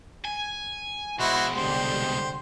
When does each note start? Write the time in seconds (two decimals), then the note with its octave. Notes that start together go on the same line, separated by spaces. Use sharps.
0.25 G#5
1.20 B2 G#3 E4 F#4 C5 F#5
1.56 C2 D3 G4 C5